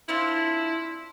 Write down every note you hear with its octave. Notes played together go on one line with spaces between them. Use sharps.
C4 D4 E4 F4